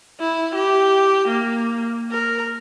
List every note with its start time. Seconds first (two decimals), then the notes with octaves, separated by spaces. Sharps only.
0.20 E4
0.55 G4
1.28 A#3
2.11 A#4